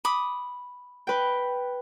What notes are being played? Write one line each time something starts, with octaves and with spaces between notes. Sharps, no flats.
B5 D6 D#6
B4 G5